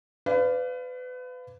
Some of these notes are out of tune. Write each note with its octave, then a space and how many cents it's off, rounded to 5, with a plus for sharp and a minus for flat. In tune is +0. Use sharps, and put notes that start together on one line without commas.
B4 +30 D5 -5 F5 +0